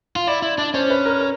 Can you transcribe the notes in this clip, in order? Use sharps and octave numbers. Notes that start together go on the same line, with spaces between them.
F4
E4 D5
E4
D4 D5
C#4 C5
B4
A#4
A#4